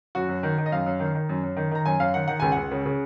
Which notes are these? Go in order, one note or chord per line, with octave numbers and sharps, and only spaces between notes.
F#2 F#4
F#2
D#3
D#3
D#5
F#2 F5
F#2
D#3
D#3
F#2
F#2
D#3
D#3 A#5
F#2 G#5
F#2 F5
D#3 F#5
D#3 F#5
C#2 G#5
C#2 F#5
C#3
C#3